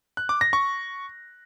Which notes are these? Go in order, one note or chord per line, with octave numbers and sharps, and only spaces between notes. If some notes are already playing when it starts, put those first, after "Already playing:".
F#6
D6
A#6
C#6